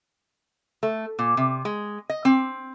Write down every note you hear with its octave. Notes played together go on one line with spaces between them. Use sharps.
A3
A#2
C3
G#3
D#5
C4